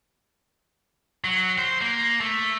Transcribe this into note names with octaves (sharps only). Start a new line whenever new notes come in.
F#3
C5
A#3
A3